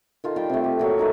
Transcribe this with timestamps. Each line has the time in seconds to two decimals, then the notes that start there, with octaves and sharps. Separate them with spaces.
0.24 D#3 F4 A4
0.36 G3 F4 G5
0.49 C3 A3
0.64 G4
0.79 A#2 F#3 A4
0.98 A3 A#3 D#4 G#5